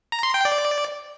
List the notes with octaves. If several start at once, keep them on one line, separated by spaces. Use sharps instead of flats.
A#5
C6
G5
D5